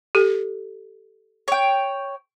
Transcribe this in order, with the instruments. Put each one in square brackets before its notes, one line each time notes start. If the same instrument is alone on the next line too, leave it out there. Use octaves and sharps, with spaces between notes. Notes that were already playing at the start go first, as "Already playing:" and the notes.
[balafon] G4 A4
[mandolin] C#5 G5